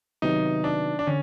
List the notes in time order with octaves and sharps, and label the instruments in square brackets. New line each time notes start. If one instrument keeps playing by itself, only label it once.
[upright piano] C3 D#3 F#3 B3 [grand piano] D#4
[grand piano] D4
D4
[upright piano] D3 [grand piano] C#4